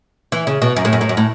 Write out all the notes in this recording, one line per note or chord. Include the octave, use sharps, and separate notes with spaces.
E3
C#3
B2
F#2
A2
F#2
A2
F#2
A2